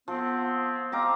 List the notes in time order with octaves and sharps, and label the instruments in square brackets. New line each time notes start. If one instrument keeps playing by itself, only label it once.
[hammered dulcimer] F3 [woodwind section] B3 C4
[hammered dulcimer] C4 A#5 D6 [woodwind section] D#5 F5